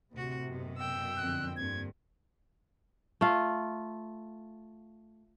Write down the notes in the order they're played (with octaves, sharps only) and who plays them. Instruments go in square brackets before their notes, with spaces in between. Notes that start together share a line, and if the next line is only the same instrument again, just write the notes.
[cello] D2 F#4 [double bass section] A2 C3
[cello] F#2 B2
[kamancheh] G5 E6
[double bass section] F2 D3 C4 [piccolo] F#6
[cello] G2 A#3 [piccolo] G#6
[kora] A3 F4